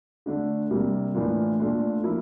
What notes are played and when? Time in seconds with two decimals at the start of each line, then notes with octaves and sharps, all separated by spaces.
0.26 D3 A3 D4
0.70 C3 G3 A#3
1.14 A2 E3 A#3 D4 F4
1.59 A#2 A3 D4 F4
2.03 F3 A#3 E4